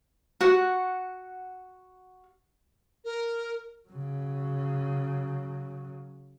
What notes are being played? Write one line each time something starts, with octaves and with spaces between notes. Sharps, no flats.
F#4 F#5
A#4
C#3 F#3